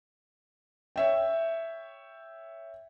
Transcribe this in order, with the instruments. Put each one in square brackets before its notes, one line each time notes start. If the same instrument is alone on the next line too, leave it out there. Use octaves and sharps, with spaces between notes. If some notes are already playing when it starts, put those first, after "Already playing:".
[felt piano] C#5 E5 G5